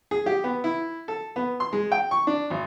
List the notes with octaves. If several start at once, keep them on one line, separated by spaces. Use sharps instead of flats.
G#4
G4
B3
E4
A4
B3
C6
G#3
G5
C#6
D4
G#1